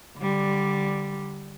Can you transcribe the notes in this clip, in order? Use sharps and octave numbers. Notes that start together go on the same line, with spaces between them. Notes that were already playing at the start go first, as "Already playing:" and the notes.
D3 G3